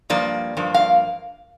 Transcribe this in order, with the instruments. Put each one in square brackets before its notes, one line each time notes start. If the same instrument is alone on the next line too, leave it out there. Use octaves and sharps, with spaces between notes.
[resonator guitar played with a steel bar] G2 F3 A#3 D5
G2 F3 A#3
F5